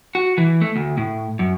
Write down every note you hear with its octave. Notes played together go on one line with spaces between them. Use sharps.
F#4
E3
A3
D2
A2
F#2